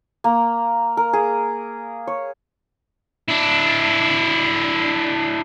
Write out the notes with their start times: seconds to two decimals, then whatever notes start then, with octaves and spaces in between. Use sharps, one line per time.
0.24 A#3
0.97 A#4
1.13 G#4
2.07 C#5
3.28 D4 E4